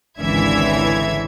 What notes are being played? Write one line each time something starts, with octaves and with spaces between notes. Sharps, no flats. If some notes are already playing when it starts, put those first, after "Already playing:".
G#1 C#2 D3 E3 E5 G#6